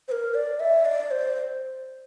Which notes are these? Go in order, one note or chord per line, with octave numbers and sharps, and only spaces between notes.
C5
A#4
D5
E5
D5
C5